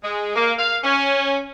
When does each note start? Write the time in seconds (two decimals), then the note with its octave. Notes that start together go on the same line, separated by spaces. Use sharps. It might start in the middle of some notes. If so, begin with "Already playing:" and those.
0.03 G#3
0.36 A#3
0.58 F5
0.84 C#4